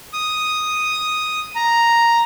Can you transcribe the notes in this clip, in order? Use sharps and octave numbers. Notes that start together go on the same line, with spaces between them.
D#6
A#5